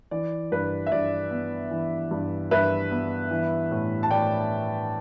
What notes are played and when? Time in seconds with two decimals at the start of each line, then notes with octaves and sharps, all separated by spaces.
0.11 E3 D5
0.52 G2 B4
0.87 E5
0.91 G2 D5
1.31 B3
1.71 E3
2.11 G2
2.51 G2 B4 E5
2.91 B3
3.31 E3
3.71 A2
4.03 A5
4.11 A2 D5 G5